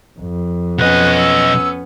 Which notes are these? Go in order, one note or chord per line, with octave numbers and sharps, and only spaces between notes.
F2
B1 B3 C#4 D#5 F#6
E6